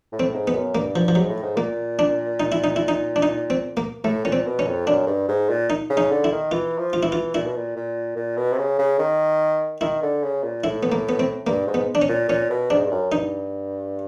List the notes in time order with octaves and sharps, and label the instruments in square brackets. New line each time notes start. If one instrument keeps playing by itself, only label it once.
[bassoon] A2
[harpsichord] C4
[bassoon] G#2
[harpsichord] B3
[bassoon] F#2
[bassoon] G2 [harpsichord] A#3
[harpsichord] F3
F3
[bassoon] G#2 [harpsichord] F#3
[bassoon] A2
G#2
[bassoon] A#2 [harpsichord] A#3
[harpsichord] D4
D#4
E4
D#4
E4
D#4
D4
D#4
C4
A#3
[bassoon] A2 [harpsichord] A3
[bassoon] A#2 [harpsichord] C#4
[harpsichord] C4
[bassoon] B2
[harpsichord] C#4
[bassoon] F2
[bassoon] F#2 [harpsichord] D4
[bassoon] G2
G#2
A#2
[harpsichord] D#4
[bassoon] C#3
[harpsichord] D#4
[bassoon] D3
[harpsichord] E4
[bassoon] D#3
[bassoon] E3 [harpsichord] F4
[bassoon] F3
[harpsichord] F4
[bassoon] E3 [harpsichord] E4
[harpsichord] F4
[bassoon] A#2 [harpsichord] E4
[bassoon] B2
A#2
A#2
A#2
B2
C3
C#3
C#3
D#3
[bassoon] D#3 [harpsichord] E4
[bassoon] D3
C#3
A#2
[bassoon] A2 [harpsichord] E4
[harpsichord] B3
A#3
B3
C4
[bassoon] G2 [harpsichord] A#3
[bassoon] G#2
[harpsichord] B3
D4
C#4
[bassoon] A#2
[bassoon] A#2 [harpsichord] C#4
[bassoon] B2
[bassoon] G#2 [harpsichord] D4
[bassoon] G2
F#2
[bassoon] G2 [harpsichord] D#4